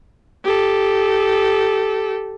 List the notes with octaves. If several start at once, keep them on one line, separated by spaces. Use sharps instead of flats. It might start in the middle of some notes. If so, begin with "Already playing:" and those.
G4 A4